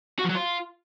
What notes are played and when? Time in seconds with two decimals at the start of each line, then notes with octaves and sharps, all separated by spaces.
0.19 F#4
0.24 F3
0.30 F#3
0.35 F4